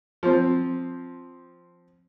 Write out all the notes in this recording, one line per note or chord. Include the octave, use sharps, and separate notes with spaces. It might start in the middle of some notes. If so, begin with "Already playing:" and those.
F3 C4